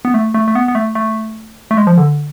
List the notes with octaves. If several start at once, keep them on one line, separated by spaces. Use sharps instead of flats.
B3
A3
A3
A3
B3
B3
A3
A3
A3
G#3
F3
D3